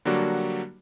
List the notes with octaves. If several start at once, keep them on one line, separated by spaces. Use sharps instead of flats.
D3 F#3 G3 A#3 D4 F#4